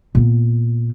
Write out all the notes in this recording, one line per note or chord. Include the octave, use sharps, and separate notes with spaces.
A#2 B3